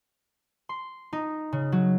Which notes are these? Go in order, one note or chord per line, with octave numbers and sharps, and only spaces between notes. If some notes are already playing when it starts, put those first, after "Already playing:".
C6
D#4
C#3
F#3